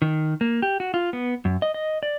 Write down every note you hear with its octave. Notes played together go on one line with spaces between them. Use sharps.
D#3
A#3
G4
F#4
F4
B3
F#2
D#5
D#5
D5